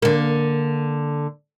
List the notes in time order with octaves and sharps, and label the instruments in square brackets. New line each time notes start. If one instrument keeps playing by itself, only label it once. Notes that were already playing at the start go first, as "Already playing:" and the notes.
[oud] D3 A#3